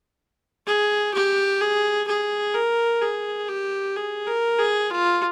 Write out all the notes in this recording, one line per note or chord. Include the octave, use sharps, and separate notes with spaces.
G#4
G4
G#4
G#4
A#4
G#4
G4
G#4
A#4
G#4
F4